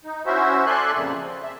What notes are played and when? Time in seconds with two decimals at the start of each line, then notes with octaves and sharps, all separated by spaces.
0.05 D#4
0.26 C#4 E4 F#4 C5 E5
0.66 A4 D5 E5 G#5 C6 F#6
0.93 F2 A#2 C#3
1.23 C4
1.43 E5